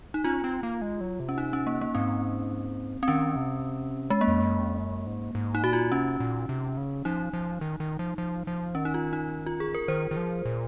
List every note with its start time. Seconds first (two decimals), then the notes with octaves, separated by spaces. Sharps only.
0.14 D#4
0.24 C#4 F4
0.44 C4
0.63 A#3
0.82 G#3
1.01 F#3
1.20 C3
1.29 C#4
1.38 D#4
1.53 C#4
1.67 A#3
1.81 A#3
1.95 G#2 C4
3.03 C4
3.08 D#3 C#4
3.36 C3
4.10 G#3
4.21 A#3
4.28 F2
4.41 F#2
4.59 F2
4.79 F#2
5.06 G#2
5.35 G#2
5.55 D#4
5.64 A#2 F#4
5.73 F4
5.92 C3 C#4
6.20 A#2
6.49 C3
6.77 C#3
7.05 F3 D#4
7.33 F3
7.61 D#3
7.80 D#3
7.99 F3
8.18 F3
8.47 F3
8.75 D#3 C#4
8.85 D#4
8.94 F4
9.13 D#4
9.46 F4
9.60 G#4
9.75 A#4
9.88 D#3 C5
10.11 D#3
10.17 F3
10.45 A#2